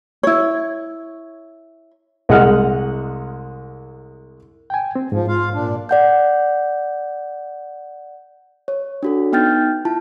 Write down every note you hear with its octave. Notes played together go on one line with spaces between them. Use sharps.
E4 C#5
C2 G#3 D#5 F#5 F6
G5 G#5
C4
G#2 F3
F4 F5
A#2 D4
D5 F#5 G6
C#5
D4 F#4 A4
B3 D#4 G5 F6 G6 A6
E4 F4 A5